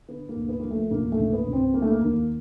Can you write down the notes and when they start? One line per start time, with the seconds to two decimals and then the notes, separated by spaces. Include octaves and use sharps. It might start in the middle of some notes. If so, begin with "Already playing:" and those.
0.09 D3 B3
0.29 A#3
0.36 D2
0.49 B3
0.60 F3 A#3
0.71 A3
0.91 C#2 A#3
1.12 A3
1.18 C#2
1.25 A#3
1.33 B3
1.46 C#2
1.53 C4
1.73 D3 A#3
1.82 A3
1.91 A#3
2.01 D#2 A#3